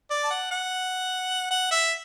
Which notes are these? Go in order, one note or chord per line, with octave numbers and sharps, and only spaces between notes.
D5
A5
F#5
F#5
F#5
E5